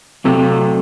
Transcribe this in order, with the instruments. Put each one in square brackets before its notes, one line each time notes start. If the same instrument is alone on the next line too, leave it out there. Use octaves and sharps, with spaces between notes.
[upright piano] C3 [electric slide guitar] F#3 A3 C4 F#4 A4